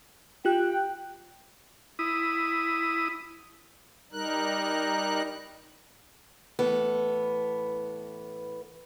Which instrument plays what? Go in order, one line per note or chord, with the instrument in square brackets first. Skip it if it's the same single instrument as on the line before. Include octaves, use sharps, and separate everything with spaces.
[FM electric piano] F4 G4 F#6 [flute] G5
[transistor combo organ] E4 D#6
[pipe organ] G3 D#4 A#4 F#6
[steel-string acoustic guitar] A2 E3 B3 A4